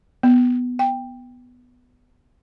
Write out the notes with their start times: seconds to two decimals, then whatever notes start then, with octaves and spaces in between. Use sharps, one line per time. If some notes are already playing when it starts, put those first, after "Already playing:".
0.23 B3
0.79 G5